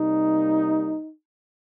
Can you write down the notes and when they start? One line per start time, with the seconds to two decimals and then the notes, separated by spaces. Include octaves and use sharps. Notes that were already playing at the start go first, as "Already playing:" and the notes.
Already playing: C3 G3 A#3 D#4